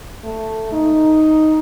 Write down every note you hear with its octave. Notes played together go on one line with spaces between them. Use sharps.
A3
D#4